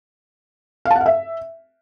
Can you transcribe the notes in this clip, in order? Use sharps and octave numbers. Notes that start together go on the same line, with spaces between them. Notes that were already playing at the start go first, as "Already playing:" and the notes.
F5
A5
F#5
F5
E5